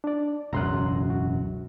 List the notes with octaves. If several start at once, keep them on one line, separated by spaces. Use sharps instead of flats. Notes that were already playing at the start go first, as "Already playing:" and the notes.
D4 D5
E1 C#2 F#2 A#5 C6 F#6
F#4